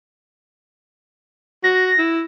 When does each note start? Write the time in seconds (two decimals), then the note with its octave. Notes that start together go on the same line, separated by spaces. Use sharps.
1.64 F#4 A#6
1.98 E4